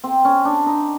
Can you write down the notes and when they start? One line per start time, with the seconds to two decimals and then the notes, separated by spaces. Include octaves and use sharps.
0.04 C4
0.25 C#4
0.45 D4
0.66 D#4